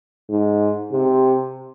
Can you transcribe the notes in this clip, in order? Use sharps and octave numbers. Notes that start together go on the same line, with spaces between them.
G#2
C3